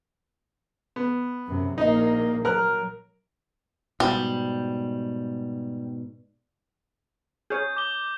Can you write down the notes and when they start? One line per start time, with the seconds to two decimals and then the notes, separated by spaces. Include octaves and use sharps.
0.96 B3
1.47 F#2 C3
1.78 A#1 A#3 D#4 D#5
2.45 F#3 A#4 F6 F#6
4.00 G#2 B2 G3
7.50 G#4 C#5 G6
7.76 D6 G7